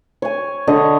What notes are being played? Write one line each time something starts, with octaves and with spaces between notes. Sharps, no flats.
C#5 G#5
D3 C#5 D#5